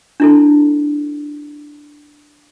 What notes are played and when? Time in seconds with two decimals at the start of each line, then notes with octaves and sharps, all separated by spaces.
0.20 D4 E4 A4